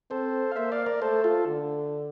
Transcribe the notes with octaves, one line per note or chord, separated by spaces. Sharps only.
C4 A4 C5
F5
A#3 C5 E5
D5 F5
A#4 D5
A3 A4 C5
F4 A4
D3